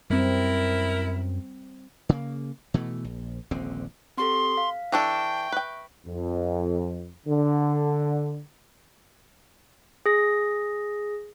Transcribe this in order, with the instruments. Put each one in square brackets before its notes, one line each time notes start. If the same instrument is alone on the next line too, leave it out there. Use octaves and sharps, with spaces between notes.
[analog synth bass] F#2 [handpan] G3 C4 [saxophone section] E4 A#4
[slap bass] C#3 A#3
B2 E3 A3
A#1
D#1 A#1 D3 C4
[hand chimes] C4 G4 A4 [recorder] C6
[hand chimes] F5
[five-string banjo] E3 D4 A4 [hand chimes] E5 C#6 [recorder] G5
[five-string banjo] B4 G5
[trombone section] F2
D3
[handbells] G#4 A#6